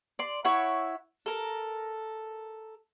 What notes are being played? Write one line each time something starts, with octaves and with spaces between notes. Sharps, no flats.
D5 C6
E4 C#5 E5 F#5
A4 A#4